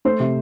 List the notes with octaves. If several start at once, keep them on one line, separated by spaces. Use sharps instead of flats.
A3 C5
C3